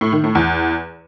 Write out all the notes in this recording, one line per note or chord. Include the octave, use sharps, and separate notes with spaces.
A2
D#3
A2
E2